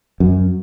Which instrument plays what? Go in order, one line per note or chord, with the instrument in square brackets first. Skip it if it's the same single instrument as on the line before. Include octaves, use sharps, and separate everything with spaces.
[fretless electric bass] F#2